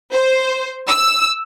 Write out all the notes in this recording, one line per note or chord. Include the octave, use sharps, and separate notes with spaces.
C5
E6